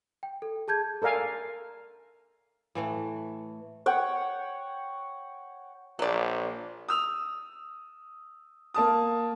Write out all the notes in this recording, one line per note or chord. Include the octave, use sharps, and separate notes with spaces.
G5
A4
G#4 A5 G6 G#6
A4 A#4 D5 F5 G#5
A2 E3 A3
C#5 F#5 G5
A#1 F#3 D5
D#6 E6 F7
A#3 A5 D#6